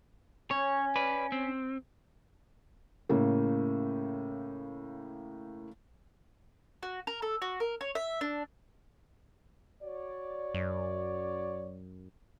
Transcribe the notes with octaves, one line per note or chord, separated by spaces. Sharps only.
C#4 C#5
B4 D5
C4
A2 C#3 A#3
F#4
A#4
A4
F#4
A#4
C#5
E5
D4
F#4 C#5 D5
F#2